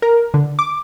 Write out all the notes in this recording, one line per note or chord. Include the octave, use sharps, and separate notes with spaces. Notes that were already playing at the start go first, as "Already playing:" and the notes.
A#4
D3
D6